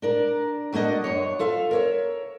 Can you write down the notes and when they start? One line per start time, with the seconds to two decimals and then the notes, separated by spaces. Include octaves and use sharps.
0.02 D4 A#4 D5
0.73 F#3 A3 A#3 D4 D#5
1.04 F#2 D4 C#5
1.39 F4 A4 E5 F5
1.71 A#4 C#5 E5